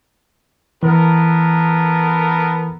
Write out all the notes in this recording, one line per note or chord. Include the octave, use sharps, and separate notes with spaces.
E3 B3 A4 A#4